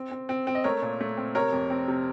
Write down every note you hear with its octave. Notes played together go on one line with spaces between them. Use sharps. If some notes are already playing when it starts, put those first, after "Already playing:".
Already playing: C4
C4
C4
C4
D#5
A3 A#4 C#5
A#2
A3
C4
C3 A#4 C#5
F2
C4
C3